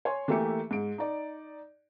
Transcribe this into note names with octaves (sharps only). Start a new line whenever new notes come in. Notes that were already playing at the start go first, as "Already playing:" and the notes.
C#5 G#5 C6
E3 A3 A#3 G4 E5 C#7
G#2 D7
D#4 D5